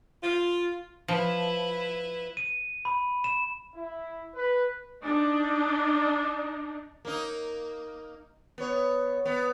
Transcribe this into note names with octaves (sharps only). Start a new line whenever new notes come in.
F4
F3 E4 B4
D#7
B5
E7
E4
B4
D4 D#4
A#3 D#4
B3 C#5
B3